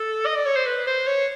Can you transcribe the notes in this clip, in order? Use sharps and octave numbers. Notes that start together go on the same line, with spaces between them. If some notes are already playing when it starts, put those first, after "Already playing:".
Already playing: A4
D#5
D5
C#5
C5
B4
C5
C#5